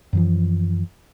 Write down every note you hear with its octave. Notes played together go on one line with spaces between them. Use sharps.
F#2 E3 F3